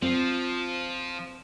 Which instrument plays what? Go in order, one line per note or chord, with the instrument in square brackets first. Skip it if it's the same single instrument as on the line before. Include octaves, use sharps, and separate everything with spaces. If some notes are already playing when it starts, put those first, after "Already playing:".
[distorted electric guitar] F3 [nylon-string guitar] C4